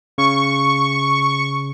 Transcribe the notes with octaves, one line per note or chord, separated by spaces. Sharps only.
C#3 C#6